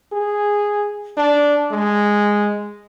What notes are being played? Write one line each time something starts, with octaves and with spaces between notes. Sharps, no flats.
G#4
D4
G#3